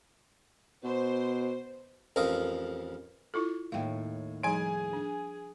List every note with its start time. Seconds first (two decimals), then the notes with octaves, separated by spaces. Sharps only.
0.84 B2 C5
2.16 A1 F2 F3 A#4 D#6
3.34 E4 F4 A4
3.72 D#2 A2 F5 G5
4.43 F3 G3 D#4 G#4 G#5 D7
4.93 D4